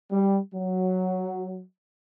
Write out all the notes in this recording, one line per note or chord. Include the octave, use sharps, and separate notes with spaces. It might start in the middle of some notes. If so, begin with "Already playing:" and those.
G3
F#3